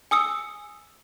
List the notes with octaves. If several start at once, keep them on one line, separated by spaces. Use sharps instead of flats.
G#5 D#6 E6 C#7